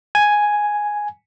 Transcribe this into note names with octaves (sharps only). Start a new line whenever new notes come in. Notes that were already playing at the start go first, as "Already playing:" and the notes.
G#5